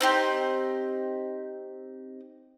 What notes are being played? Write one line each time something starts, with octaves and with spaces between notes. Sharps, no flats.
C4 D#4 G4